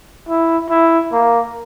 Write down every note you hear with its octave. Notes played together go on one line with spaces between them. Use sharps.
E4
E4
A#3